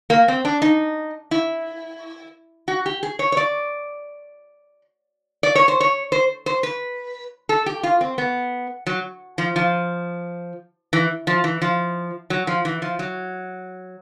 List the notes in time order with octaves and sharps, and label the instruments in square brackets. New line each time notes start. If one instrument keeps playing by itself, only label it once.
[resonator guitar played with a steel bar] A#3
C4
D4
D#4
E4
F#4
G4
G#4
C#5
C#5
D5
D5
C#5
C5
C#5
C5
C5
B4
A4
G4
F4
C4
B3
F#3
F3
F3
E3
F3
E3
F3
F#3
F3
E3
F3
F#3